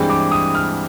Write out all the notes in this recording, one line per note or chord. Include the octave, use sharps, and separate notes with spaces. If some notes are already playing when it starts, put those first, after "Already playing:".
Already playing: G2 E3 G#3 C4
D6
D#6
F6